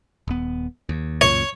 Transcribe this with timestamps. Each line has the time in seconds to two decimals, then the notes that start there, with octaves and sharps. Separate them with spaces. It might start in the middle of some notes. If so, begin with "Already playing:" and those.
0.28 D#1 B3
0.89 D#2
1.21 C#2 F#2 A#2 C#5